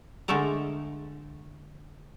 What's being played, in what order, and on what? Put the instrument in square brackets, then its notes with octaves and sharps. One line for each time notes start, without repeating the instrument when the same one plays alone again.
[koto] D3 G#3 A3 A4 A#4